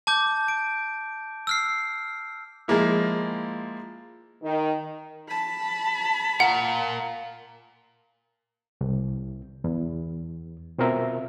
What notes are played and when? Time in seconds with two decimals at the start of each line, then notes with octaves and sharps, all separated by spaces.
0.07 A5 D6 G6
0.48 D7
1.47 E6 F6 C7
2.68 F3 G#3 A#3 E4
4.43 D#3
5.28 A5 B5
6.40 F4 A#4 F#5
8.81 C2
9.64 E2
10.78 B2 C4 F4 A#4 E5